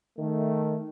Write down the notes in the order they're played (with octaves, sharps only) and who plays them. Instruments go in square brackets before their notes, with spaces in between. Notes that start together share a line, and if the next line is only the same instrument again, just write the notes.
[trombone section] D#3 A3